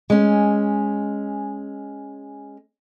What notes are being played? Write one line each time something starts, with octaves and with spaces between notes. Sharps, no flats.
G#3 C#4